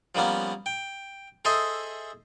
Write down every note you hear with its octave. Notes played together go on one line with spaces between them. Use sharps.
F3 G3 A#3 B3 C#4
G5
G#4 A4 C5 D#5 E5